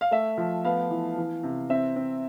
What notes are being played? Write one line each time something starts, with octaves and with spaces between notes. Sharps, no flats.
F5
A3 E5
F3
B3 F5
E3
E3
C3
C4 E5
C4